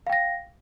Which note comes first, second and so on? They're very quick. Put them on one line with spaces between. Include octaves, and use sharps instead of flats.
F5 G5 A#6